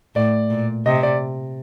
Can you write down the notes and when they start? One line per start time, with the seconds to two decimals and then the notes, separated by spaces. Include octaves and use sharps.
0.15 A2 D5
0.50 A#2
0.86 C3 D#5
1.03 D5